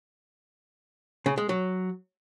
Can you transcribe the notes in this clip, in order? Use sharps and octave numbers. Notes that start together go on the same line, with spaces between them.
C#3
G#3
F#3